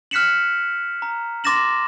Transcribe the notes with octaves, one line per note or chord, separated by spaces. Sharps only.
F6 F#6 B6 C#7 E7 F#7
A#5
C6 D6 A6 A#6 E7 F#7